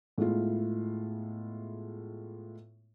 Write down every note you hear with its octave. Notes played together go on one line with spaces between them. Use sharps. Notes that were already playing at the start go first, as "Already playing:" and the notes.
A2 G#3 B3 E4 F4